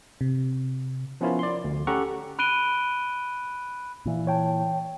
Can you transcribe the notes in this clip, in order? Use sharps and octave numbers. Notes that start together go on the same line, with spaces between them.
C3
F3 B3 C#4 E4 F4 A#4
D5 C6
D2
C#4 G4 A4 F#5 A#5 C#6
B5 F#6 D7 D#7 G7
A#2 E3
C#5 G5 A5